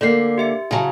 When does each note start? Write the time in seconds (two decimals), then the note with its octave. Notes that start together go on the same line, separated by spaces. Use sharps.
0.01 D3 A#3 D5 G6 C7
0.38 G4 E5 C#7
0.71 C#3 F#3 G#5 A5